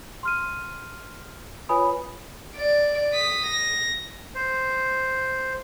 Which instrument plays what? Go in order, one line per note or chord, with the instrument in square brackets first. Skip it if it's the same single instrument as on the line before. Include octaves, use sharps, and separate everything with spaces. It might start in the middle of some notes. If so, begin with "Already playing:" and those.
[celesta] C6 F6 D#7
F4 B4 C#5 G#5 B5 D#6
[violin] D5
D#6 B6
A#6
[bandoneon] C5